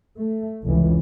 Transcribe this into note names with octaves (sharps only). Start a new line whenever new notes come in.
A3
F1 C#2 E3